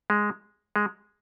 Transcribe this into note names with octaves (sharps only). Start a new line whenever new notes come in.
G#3
G#3